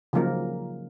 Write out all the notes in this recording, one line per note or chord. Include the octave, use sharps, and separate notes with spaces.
C#3 F3 F#3 A#3 D#4 A#4